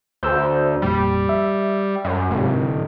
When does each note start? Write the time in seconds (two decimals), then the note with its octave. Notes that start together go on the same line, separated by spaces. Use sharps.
0.23 D2 C5 E6 G6
0.82 G#1 F2 A#2 G3
1.29 E5
2.05 F#2
2.31 D1 G#2 C3